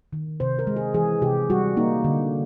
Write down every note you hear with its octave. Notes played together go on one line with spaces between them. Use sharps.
D#3
C3 C5
A#4
G#3
G#4
E3 G#4
C3 G4
G3 F#4
A#3 D#4
D3